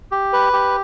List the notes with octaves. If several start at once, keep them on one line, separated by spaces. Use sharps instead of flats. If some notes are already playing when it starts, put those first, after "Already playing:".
G4
B4
G4